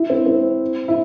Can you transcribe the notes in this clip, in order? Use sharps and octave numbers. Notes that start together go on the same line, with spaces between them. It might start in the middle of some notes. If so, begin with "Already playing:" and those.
Already playing: E4
C4
C4
E4